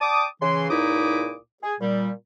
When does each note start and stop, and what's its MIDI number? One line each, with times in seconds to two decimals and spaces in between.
0.01 0.26 74
0.01 0.26 79
0.01 0.26 81
0.01 0.26 86
0.01 0.26 87
0.42 0.70 49
0.42 0.70 52
0.42 0.70 84
0.70 1.36 37
0.70 1.36 46
0.70 1.36 63
0.70 1.36 64
0.70 1.36 86
0.70 1.36 87
1.63 1.74 68
1.81 2.11 46
1.81 2.11 55